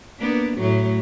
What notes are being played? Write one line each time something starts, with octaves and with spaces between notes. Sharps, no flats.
A#3 B3 D4
A2 F#3 A3